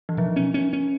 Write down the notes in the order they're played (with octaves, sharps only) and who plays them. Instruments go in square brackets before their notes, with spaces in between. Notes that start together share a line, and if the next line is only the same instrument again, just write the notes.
[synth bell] E3
[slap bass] B2 [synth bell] F3
[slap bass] C#4
C#4
C#4